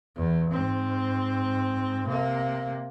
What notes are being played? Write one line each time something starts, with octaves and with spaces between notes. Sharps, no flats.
E2
G#2 C4
C3 A#3